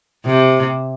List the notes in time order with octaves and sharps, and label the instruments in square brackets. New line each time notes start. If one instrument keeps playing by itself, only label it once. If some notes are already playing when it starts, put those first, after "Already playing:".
[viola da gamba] C3